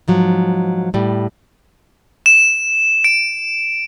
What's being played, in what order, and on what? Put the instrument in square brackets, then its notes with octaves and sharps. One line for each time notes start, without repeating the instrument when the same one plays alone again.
[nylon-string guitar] G#2 F3 F#3
A2 G3
[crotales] E7
D7